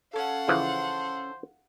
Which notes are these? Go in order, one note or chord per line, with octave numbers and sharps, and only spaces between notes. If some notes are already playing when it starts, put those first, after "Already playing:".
C#4 A4 F5 F#5
C#3 E3 F3 C5